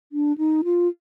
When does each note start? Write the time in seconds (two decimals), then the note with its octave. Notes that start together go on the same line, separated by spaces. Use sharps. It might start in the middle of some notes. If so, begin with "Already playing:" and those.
0.12 D4
0.38 D#4
0.64 F4